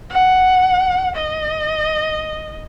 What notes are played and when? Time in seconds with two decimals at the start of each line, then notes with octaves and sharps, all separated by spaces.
0.10 F#5
1.16 D#5